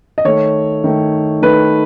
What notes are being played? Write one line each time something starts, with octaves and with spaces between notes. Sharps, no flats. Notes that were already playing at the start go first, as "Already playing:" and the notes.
D#5
D#3 A3 C#5
D#3 A3
D#3 A3 B4